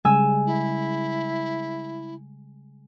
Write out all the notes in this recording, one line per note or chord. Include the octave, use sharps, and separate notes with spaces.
C#3 G3 G#3 G#5 E6
E4